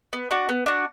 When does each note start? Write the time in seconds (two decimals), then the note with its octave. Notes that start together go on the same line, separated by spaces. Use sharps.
0.13 B3
0.31 D4 F#4
0.49 B3
0.66 D4 F#4